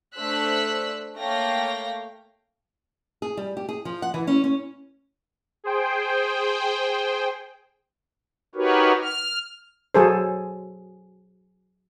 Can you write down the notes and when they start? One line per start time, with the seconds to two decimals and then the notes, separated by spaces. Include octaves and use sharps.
0.15 A3 D4 C5 E6 F#6 B6
1.18 A3 A#3 C#5 F5 G5 A#6
3.22 G#4
3.37 G3
3.57 G4
3.69 G#4
3.85 F3
4.02 F#5
4.14 E3
4.27 C#4
4.44 C#4
5.64 G#4 C5 G5
8.55 D#4 F#4 G4 A#4 B4 C#5
9.01 F6
9.95 F#3 G#4 A4 C5